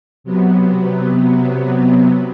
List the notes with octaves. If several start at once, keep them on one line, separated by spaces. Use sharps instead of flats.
C3 F#3 B3